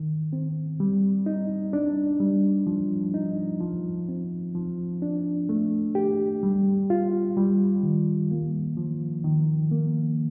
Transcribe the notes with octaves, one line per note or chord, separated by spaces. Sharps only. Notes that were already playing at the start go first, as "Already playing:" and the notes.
Already playing: D#3
C4
G3
D#4
D4
G3
F3
D#4
F3
C4
F3
D4
A3
G4
G3
F4
G3
D#3
A#3
F3
D#3
A#3